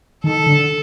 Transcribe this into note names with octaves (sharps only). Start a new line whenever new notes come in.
D#3 A4
D3